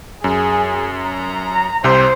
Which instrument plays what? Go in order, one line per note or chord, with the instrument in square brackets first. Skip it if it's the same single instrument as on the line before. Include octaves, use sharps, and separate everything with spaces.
[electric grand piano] F#2 [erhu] G#4
[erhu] A#5
[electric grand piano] C2 C3 G6 [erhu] C5